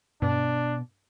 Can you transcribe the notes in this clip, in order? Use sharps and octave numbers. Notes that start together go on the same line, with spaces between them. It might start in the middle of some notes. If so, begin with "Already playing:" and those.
G2 B2 D4